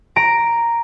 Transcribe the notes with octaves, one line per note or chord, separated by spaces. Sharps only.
A#5 A#6 D7